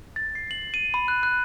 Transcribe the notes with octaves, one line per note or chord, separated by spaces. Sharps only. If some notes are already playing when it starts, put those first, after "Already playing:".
A6
C7
F#7
D#7
B5
F#6
F#6